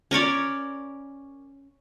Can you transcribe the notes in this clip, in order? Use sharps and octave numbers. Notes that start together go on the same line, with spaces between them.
C#4 A#4 C#5 D5